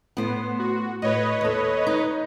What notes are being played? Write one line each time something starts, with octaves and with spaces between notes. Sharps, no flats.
A2 B3 C5
F#4
A2 B4 C#5 D#5
D#2 A4
D#4